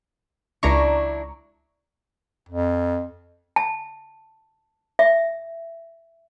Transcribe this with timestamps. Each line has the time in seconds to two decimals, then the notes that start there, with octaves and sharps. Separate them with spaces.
0.63 C#2 F#3 D4 E4 A#5 C#6
2.49 F2
3.56 A5
4.99 E5